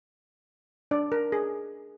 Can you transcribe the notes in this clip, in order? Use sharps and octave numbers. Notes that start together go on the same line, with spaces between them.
D4 D5
A#4
G#4